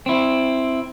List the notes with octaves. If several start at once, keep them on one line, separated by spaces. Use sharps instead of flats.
C4 E4